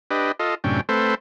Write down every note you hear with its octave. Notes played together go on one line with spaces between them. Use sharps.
D4 G4 B4 D#5
F4 A4 D#5
F#2 A2 C3 C#4 D4 G5
A3 C4 A4 B4 C5